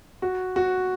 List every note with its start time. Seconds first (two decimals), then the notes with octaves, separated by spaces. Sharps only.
0.22 F#4
0.56 F#4